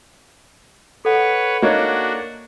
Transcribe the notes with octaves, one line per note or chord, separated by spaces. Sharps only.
A4 B4 C#5 F#5
A#3 D4 D#4 F#4 C#5